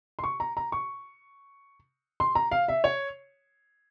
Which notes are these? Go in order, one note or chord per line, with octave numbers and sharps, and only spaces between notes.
C6
C#6
A#5
A#5
C#6
C6
A#5
F5
E5
C#5